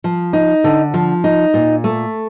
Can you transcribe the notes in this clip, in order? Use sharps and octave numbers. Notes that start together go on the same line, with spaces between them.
F3
D#4
D3
F3
D#4
A#2
A3